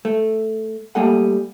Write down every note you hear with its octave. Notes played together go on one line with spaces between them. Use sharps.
A3
G3 A3 A#3 G#4 A4 F#5